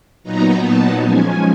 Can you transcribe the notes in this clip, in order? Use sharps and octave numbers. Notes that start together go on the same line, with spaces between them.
A#2 F#3 B3 D#4 A#5
A5
F3 G#3 C#4 G#5